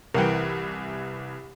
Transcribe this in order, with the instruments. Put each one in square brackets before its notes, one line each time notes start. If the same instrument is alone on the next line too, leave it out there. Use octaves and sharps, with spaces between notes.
[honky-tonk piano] C2 E3 [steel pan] A#4 F#5 G5